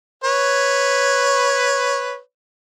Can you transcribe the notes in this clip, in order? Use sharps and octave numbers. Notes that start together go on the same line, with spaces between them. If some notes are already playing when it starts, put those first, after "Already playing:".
B4 C#5